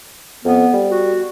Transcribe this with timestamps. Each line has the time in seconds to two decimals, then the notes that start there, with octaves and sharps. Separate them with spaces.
0.45 F2 B3
0.73 G3
0.91 F#4